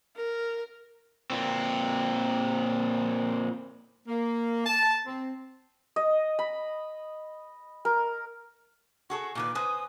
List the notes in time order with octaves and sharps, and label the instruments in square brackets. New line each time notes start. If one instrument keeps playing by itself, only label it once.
[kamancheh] A#4
[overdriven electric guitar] A#2 C4
[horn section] A#3
A5
C4
[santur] D#5
B5
A#4
[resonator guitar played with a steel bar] F#4 G#4 A4 [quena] C#6
[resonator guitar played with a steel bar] A#2 D#3 B4 [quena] D6
[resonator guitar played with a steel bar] B4 C5 G#5 [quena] D#6